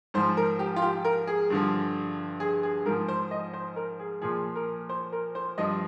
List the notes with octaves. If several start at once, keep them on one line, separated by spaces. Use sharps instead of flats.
G#2 F3 C5
A#4
G4
F4
G4
A#4
G#4
G2 D3 F3
G#4
G#4
G#2 F3 A#4
C5
D#5
C5
A#4
G#4
A#2 F3 G#4
A#4
C5
A#4
C5
G2 F3 D#5